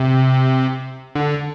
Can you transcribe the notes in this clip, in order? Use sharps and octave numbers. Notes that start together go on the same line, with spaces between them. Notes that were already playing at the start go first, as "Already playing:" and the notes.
Already playing: C3
D3